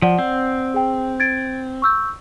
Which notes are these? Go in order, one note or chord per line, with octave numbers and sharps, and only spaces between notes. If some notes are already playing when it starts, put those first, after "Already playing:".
F3 D5 F#5
C4
G#4 G5
G#6 A6 D7
C#6 E6 G6